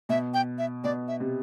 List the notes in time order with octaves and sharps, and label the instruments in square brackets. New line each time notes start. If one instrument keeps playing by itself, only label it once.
[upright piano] B2 [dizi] E5
[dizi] G5
E5
[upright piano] B2 [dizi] D5
[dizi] E5
[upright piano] C3